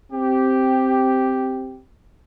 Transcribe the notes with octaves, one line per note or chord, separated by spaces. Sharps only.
C4 G4